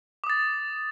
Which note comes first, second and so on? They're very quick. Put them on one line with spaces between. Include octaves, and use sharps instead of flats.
D6 D#6 A6